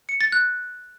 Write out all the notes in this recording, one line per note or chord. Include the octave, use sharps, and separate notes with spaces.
C#7
A6
F#6